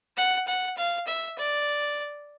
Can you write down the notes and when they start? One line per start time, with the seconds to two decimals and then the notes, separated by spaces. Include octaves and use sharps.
0.17 F#5
0.47 F#5
0.78 F5
1.07 E5
1.38 D5